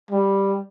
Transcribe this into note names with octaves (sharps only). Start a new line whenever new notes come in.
G3